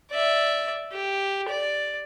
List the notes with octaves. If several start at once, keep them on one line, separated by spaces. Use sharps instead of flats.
D5 E5
G4
D5